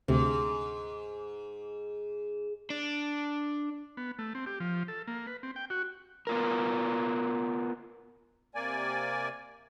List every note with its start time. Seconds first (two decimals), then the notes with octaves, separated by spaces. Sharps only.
0.08 D2 G#2 C3
2.70 D4
3.97 B3
4.19 A3
4.35 C4
4.46 G4
4.60 F3
4.88 A4
5.07 A#3
5.27 B4
5.43 C4
5.56 G5
5.70 F#4
6.27 B3 F4 A#4
8.55 C3 A#3 D5 G#5